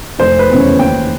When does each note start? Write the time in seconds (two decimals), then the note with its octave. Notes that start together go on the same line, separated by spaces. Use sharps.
0.19 F1 C5
0.39 B4
0.49 E2 C#3
0.60 C#5
0.79 D#2 G5